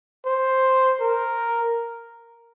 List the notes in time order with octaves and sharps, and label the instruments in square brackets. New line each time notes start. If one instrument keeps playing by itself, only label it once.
[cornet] C5
A#4